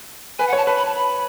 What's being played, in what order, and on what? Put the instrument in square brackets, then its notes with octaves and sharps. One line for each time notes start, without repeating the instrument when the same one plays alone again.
[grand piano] B4 [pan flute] G#5
[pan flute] F#5
[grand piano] C#5 [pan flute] A5
[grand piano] B4 [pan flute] A5
[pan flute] B5
A5
B5